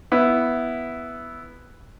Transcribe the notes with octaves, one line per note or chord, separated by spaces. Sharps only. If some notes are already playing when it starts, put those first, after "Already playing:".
B3 E4